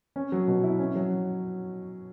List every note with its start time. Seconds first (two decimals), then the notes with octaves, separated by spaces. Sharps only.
0.16 C#4
0.32 F#3
0.48 B2
0.63 E4
0.79 C#4
0.95 F#3